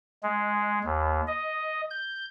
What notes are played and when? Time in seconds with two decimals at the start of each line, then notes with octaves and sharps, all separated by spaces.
0.23 G#3
0.84 D#2
1.27 D#5
1.91 G6